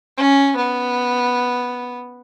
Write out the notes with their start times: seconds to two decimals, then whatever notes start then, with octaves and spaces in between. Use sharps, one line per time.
0.18 C#4
0.56 B3